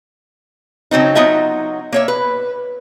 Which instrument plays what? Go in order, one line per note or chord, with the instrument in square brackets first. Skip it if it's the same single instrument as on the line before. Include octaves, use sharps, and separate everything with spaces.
[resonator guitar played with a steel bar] C#3 F#3 C4 D#4
F#3 B3 D#4 F4 D#5 E5
A#3 C#5 E5
B4